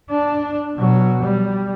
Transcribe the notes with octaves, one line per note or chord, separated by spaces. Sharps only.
D4
B2 F#3
G3